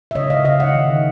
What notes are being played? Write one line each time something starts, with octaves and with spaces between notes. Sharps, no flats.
E5
C#3 C#5 D#5
D#5 F5
C#3 D#5 F5
E5 F#5
D#3